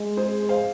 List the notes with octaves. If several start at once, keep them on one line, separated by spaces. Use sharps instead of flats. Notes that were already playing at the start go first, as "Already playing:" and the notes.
Already playing: G#3
G#4 C5
C5 F5